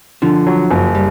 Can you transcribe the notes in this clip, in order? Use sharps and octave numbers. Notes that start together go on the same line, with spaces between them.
D3 F3
F#3
F#1
G3